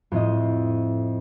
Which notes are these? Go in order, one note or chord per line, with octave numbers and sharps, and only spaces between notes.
F2 A2 D#5